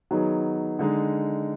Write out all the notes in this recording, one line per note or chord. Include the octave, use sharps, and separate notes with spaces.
D#3 F#3 B3 D#4 G#4
D3 G#3 D#4